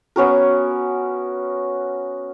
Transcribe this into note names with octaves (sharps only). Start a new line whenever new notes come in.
B3 C#4 F#4 A#4